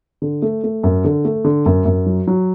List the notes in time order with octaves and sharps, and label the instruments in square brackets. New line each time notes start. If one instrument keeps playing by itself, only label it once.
[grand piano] D3
A3
A3
F#2
D3
A3
D3
F#2
F#2
F#3
F#3